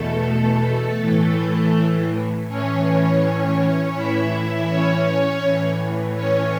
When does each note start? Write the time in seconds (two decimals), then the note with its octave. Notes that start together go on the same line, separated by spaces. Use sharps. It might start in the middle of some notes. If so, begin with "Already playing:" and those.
Already playing: E2 B2 A3 A4
1.01 A2 E3
2.48 A2 E3 C#4 C#5
3.95 A2 E3 E4 E5
4.69 C#4 C#5
5.42 A2 E3
6.16 C#4 C#5